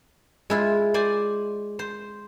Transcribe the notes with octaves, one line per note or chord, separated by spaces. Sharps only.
G#3 E4 F4
C5 D5 G#5
C5